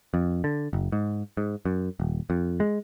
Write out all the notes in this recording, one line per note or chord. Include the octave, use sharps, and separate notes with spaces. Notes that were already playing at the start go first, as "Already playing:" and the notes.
F2
D3
F#1
G#2
G#2
F#2
D#1
F2
G#3